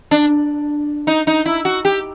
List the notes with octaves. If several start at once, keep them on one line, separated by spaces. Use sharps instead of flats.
D4
D#4
D#4
E4
F#4
G4